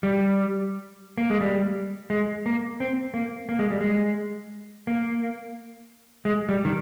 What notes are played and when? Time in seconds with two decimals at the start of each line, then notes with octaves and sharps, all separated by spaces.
0.03 G3
1.18 A#3
1.30 G#3
1.41 G3
2.10 G#3
2.46 A#3
2.80 C4
3.14 A#3
3.49 A#3
3.59 G#3
3.70 G3
3.81 G#3
4.87 A#3
6.25 G#3
6.49 G3
6.65 D#3